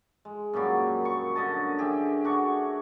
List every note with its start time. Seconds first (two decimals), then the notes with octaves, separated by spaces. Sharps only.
0.25 G#3
0.53 F#2 A#2 F#3 G3
1.05 C#6
1.35 D3 D#5 A5
1.79 G4 G#4 E5
2.24 D4 F#4 C#6